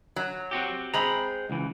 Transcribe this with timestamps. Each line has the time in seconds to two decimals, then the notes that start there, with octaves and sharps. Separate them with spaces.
0.16 F#3
0.51 C4 F#4 G4
0.94 G#3 C4 A#5 B5
1.50 C#2 E3